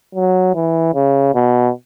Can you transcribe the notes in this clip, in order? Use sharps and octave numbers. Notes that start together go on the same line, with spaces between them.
F#3
E3
C#3
B2